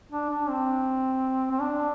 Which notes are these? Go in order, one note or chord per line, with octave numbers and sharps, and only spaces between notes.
D4
D4
C4
C4
D4